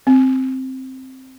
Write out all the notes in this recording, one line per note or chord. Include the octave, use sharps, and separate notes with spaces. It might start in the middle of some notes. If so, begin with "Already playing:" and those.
C4